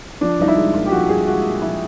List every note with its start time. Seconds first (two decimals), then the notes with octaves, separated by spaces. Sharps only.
0.21 F3 D4
0.39 C2 D#4
0.48 E4
0.57 G#3
0.74 A#2 F4
0.86 G4
0.92 F3 F#4
1.09 C2 G#4
1.27 G#3 F#4
1.44 A#2
1.62 F3 E4